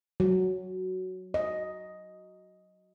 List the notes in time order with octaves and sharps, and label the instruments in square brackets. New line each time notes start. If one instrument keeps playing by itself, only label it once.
[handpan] F#3
D#5